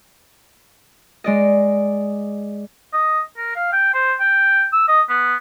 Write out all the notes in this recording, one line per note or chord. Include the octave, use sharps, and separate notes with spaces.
G#3 D5 D#5
D#5
A#4
F5
G5
C5
G5
E6
D#5
B3